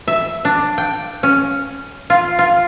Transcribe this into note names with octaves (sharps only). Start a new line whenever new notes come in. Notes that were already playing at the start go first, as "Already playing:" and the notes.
E5
D4
G5
C#4
F4
F4